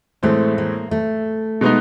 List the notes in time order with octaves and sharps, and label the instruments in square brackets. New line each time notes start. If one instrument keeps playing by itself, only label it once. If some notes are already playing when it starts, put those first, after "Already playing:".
[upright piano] A2 E3 G#3 C4 [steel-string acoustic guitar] A3
[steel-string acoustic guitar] A#3
A3
[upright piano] B2 G#3 B3 D#4